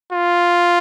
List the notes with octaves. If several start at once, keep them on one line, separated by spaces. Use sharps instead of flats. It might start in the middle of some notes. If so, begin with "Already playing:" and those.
F4